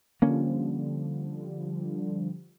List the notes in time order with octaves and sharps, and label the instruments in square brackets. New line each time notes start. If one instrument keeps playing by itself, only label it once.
[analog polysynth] D3 F3 G3 [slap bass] A#3 C#4